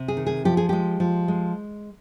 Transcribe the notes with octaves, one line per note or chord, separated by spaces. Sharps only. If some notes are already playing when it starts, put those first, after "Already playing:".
Already playing: C3
G#4
D#3
G#4
F3 G4
G#4
G#3 G4
F3
G#3